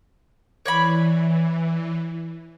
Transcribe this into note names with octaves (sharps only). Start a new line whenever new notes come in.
E3 C#5 D5 B5